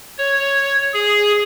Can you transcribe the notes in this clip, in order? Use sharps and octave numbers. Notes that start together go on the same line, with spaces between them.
C#5
G#4